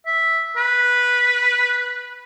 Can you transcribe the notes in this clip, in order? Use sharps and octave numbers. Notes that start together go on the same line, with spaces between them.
E5
B4